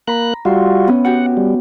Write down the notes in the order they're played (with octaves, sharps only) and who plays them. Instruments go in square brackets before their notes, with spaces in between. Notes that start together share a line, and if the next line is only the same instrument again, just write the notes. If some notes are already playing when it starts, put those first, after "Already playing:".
[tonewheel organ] A#3 F#6 [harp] A#5 B5
[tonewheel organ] G3 F4 F#4 [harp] E5 C6
[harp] B3 C#4
[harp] F#4 G4 [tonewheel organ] F#5
[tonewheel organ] G3